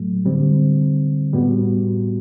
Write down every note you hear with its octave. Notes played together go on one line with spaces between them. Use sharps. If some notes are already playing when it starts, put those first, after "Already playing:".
Already playing: A2 F#3 A3
D3 G3 C4
A2 G3 B3 F#4